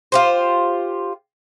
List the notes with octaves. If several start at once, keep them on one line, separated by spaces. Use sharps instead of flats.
F4 G4 C5